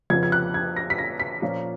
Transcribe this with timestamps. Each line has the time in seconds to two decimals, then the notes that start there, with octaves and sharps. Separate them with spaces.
0.10 F2 C#3 F3 B3 G#6
0.23 G#6
0.32 F#6
0.54 G#6
0.76 A#6
0.90 B6
0.98 A#6
1.20 B6
1.42 A#2 F3 A#3 C#4